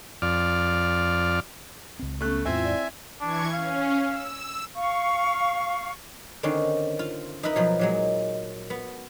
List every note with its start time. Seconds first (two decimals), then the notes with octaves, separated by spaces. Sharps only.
0.22 F2 D5 F6
1.99 C#2 C4
2.21 A3 B3 C#4 F#6
2.45 D#2 G#2 C4 E4 F4 E5 G#5
2.64 E4 D5
3.21 E3 D4 C#6 G#6
3.53 C#4 F5
4.05 E6
4.74 F5 C#6
6.43 D3 D#3 C4 C#4
6.99 F4
7.43 D#4 A#4 B4 E5 B5
7.56 B2 F3 F#3
7.79 A#2 F#3 G#3
8.70 B3